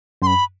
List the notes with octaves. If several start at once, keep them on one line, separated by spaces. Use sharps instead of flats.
F#2 C6
B5